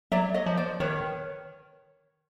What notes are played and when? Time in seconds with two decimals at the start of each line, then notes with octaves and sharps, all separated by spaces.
0.12 F#3 D5 E5
0.34 C#5 D#5
0.46 F3
0.57 C5 D5
0.80 D#3 B4 C#5